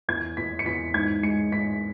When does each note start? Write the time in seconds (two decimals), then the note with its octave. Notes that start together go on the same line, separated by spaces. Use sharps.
0.08 E2 G#6
0.37 E2 B6
0.59 C#7
0.66 E2 B6
0.94 G#2 G#6
1.23 G#3 C#7
1.52 G#2 B6